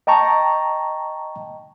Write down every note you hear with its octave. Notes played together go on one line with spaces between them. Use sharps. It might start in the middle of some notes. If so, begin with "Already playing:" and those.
D#5 G5 A5 A#5 C#6